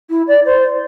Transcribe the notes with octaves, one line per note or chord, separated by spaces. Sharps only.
E4
D5
C5